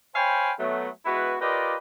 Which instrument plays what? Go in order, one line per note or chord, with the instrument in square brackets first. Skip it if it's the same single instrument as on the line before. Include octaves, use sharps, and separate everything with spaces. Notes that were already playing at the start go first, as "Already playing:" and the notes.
[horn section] C5 C#5 F5 G5 G#5 B5
F#3 A3 B3
G#3 B3 E4 F#4 B4
F4 G4 A#4 B4 D5 D#5